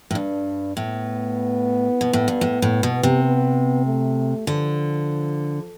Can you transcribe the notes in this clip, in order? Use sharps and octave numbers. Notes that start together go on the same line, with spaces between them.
A2
G2 D4
A2 B3
B2
A2
G2
A2
A2
B2
C3
B3
A3
D3 F3